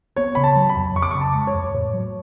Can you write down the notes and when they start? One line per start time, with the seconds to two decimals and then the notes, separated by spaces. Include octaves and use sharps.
0.16 B3 C#5
0.35 C#3 B5
0.44 A5
0.56 F#3
0.69 B5
0.76 F2
0.95 F2 C#6
1.02 D6
1.11 C#3 C#6
1.21 A5
1.35 G#3
1.47 C#5
1.54 F2
1.74 A2 C#5
1.93 F#3